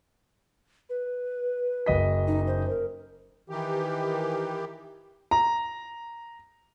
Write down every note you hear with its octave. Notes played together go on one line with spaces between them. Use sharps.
B4
F#1 D#5 B6
D#4
C5
A#4
D#3 E3 G4
A#5